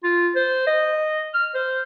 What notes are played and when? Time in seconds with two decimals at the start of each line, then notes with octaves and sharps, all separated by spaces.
0.04 F4
0.35 C5
0.67 D#5
1.34 F6
1.54 C5